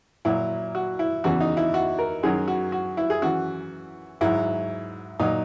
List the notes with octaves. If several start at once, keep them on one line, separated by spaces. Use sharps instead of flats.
A#2 F#3 E4
F#4
E4
E2 C#3 E3 F#4
D#4
E4
F#4
A#4
F#2 D#3 F#3 G#4
F#4
F#4
E4
G#4
F#2 E3 F#4
G#2 F#3 E4
A#2 F#3 D#4